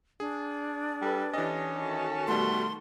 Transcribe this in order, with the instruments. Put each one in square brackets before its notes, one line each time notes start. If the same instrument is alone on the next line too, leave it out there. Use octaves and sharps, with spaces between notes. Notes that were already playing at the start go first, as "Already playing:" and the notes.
[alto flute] D4 [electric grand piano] G#4
[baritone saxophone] G3 [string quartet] A4 B4
[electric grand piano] E3 D#5 [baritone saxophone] C#4 [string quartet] G4 A4
[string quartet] D#3 F#4 A4
[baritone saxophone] B2 [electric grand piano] G3 A3 [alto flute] C6